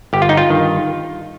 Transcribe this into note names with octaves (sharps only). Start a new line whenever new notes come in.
G1 G4
F4
D#4
F4
G2 D#3